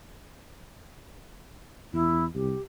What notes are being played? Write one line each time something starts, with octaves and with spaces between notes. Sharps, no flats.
E2 E4
C2 G4